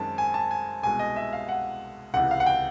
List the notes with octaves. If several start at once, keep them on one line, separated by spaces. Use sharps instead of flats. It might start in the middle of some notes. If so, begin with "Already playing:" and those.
Already playing: F#2 D#3 G#3 C4 D#4 A5
G#5
A5
G#5
C2 B2 G#3 G#5
D#5
E5
F5
F#5
C#2 C3 E3 F#5
F5
F#5
G5